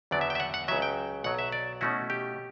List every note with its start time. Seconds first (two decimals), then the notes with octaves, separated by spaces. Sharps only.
0.11 E2 D3 F#3 B3 D5
0.21 E5
0.30 G5
0.35 E5
0.40 F#5
0.54 F#5
0.68 C#2 C#3 F#3 E5
0.82 G5
1.24 B1 B2 F#3 F#5
1.39 E5
1.52 D5
1.81 B2 A3 C#4 E4 F#4
2.10 G4